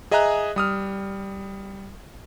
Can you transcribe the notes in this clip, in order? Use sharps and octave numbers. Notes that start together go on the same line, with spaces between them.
G#4 D#5 E5 G#5 A#5 F#6
G3 D#6 F6